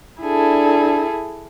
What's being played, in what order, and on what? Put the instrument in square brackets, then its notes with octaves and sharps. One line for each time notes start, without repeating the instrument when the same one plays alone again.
[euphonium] D4 [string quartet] E4 G#4 A4